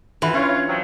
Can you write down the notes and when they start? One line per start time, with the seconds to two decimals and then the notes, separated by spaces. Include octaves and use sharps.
0.22 E3 F4 F#4 B4
0.34 C#4 D4 F4 C#5
0.68 C3 F3 F#3